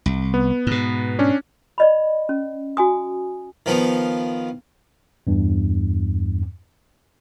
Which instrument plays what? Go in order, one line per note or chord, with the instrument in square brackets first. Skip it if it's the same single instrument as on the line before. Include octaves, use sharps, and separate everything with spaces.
[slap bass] C2
[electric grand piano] B3
[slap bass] G#2 B2
[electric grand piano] C#4 D4
[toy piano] D5 D#5 B5
C#4
F#4 G#5 D#6
[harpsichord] D#3 F3 B3
[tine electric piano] E2 G2